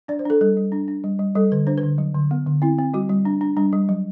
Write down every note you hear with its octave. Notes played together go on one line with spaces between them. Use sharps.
D4 D5
C5
D4 A4
G3 A4
G3
D4
D4
G3
G3
G3 A4
D3 B4
D4 C5
B4
D3
F#3
D3
B3
D3
C4 E4
C4
G3 F#4
G3
D4
D4
G3 D4
G3
F#3